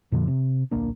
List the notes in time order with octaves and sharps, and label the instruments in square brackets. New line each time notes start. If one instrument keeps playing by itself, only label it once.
[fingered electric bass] F2 A#2 D3 F3
C3
D1 A#1 A#3 D4